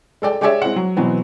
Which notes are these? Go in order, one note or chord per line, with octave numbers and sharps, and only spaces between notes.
G#3 A4 D5 G5
G#3 G4 G#4 C#5 D5 E5
G#3 C4 E4 F#5
F#3
B2 E3 F#3 B3 C4